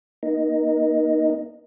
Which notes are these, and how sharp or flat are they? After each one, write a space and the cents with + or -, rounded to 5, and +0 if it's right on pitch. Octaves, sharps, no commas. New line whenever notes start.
A#3 +35 D#4 +0